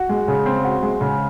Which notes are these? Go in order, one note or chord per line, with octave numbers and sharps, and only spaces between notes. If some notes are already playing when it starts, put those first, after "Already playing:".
Already playing: F#4
G#3
C#3
C4
F#4
G#3
C#3